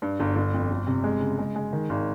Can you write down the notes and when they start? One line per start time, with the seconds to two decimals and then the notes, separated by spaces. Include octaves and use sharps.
0.02 G2
0.20 G1
0.36 G1
0.54 F2
0.71 G1
0.87 C3
1.04 G#3
1.21 C#3
1.38 G#3
1.56 G#3
1.73 D#3
1.89 G#1